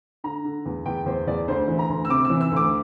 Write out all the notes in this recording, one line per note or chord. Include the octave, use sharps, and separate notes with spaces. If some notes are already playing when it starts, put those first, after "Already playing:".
D3 A#5
D3
E2
E2 G5
E2 C5
E2 D5
D2 C5
E3
A#5
D2
E6
C3 D6
E6
E3
E6
D2 D6